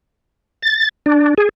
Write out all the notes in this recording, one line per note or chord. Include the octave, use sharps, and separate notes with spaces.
A6
D4
G#4